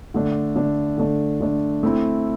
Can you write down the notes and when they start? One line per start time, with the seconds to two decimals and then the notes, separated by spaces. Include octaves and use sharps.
0.14 D3 A3 D4
0.56 D3 A3 D4
0.98 D3 A3 D4
1.41 D3 A3 D4
1.83 A3 C4 E4